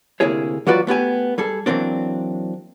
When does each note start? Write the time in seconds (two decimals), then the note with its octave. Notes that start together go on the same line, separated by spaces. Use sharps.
0.20 D2 C3 A#3 E4 G#4 C#5
0.67 E3 F#3 F4 F#4 B4 D5
0.87 A3 B3 G4 G#5
1.38 G3 G#4 A4
1.66 E3 F#3 A#3 C4 D4